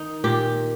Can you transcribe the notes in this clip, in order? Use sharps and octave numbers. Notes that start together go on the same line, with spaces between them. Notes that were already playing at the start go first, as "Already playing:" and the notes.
Already playing: D#3 D#4
A#2 G4